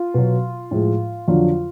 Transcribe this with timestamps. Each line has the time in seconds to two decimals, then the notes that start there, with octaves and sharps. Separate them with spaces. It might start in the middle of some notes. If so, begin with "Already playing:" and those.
Already playing: F4
0.14 B2 F#3
0.71 A2 F3 G#3
1.28 F2 D3 F#3 F4